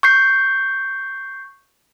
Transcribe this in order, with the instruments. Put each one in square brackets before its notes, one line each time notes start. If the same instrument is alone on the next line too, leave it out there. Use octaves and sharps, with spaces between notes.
[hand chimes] C#6 G6 C7